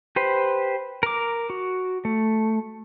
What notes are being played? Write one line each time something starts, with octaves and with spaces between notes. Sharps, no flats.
G4 B4 C5
A#4 D6
F#4
A3